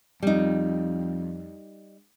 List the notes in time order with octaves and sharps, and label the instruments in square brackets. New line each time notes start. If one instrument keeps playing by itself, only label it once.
[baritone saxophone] F2 [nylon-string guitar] G3 D#4